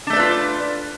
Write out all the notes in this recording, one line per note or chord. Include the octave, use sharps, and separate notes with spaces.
A3 D4 F4 B4 D5